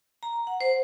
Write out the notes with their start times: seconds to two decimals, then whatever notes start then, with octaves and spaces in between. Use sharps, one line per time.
0.23 A#5
0.47 F#5
0.61 C5